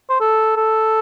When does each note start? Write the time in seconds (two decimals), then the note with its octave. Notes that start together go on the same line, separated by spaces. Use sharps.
0.10 C5
0.20 A4
0.56 A4